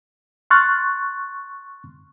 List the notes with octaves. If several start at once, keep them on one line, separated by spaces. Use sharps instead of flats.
C6 C#6 F6 F#6 A6